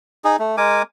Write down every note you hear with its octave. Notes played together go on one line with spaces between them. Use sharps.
D#4 G#4
A3
G#3 A#4 G#5 D6